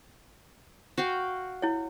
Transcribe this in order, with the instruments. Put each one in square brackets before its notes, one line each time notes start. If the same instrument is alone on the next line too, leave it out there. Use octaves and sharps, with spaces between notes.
[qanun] F#4 F5 G5
[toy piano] E4 C#5